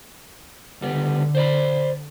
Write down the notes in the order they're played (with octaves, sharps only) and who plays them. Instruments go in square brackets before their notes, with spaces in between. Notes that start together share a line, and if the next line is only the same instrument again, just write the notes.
[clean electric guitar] C#2 G3 B3 [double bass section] D3
[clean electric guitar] C5 D5 B5